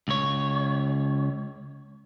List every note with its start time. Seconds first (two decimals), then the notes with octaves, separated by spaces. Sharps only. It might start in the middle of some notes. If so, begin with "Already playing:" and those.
0.08 C#2 C#5